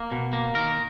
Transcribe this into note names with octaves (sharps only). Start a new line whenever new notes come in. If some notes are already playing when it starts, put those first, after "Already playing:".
Already playing: A#3
B2
A#3
D#3 A#4